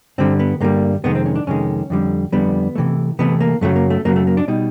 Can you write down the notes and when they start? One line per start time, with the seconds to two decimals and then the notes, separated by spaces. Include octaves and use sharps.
0.18 G2 D3 G3 C4
0.40 B3
0.61 G2 D3 G3 A#3
1.04 F2 C3 D#3 G#3 B3
1.15 C4
1.26 C#4
1.36 D4
1.47 F2 C3 D#3 G#3 C#4
1.90 F2 D3 G3
2.32 F2 D3 G3 B3
2.75 C3 E3 A3
3.19 C3 E3 A3 B3
3.41 A#3
3.61 F#2 C#3 F#3 A3
3.76 A#3
3.90 A3
4.05 F#2 C#3 F#3 A#3
4.16 A3
4.27 A#3
4.37 D4
4.48 B2 G3 D#4